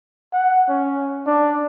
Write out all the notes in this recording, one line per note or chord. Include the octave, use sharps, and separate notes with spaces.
F#5
C#4
D4